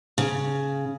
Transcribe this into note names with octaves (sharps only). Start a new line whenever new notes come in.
C#3